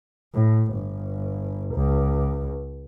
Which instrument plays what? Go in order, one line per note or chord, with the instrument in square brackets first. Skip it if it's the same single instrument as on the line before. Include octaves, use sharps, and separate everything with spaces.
[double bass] A2
G1
C#2